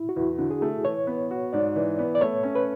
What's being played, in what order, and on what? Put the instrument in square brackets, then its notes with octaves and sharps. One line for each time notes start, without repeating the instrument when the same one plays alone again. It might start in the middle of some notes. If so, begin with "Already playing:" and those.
Already playing: [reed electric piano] E4
F#4
[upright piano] E2 [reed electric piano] E4
[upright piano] D3
[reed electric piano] G#4
[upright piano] A3
[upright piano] E3 [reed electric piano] C#5
[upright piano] B3
F#4
[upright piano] G#2 [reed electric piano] D5
[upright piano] E3
B3
[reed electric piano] D5
[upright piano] A3 [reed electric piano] C#5
[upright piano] C#4
[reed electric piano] B4